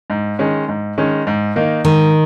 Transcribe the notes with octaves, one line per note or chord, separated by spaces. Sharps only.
G#2
D#3 G#3 C#4
G#2
D#3 G#3 C#4
G#2
D#3 A#3 D#4
G#2 D#3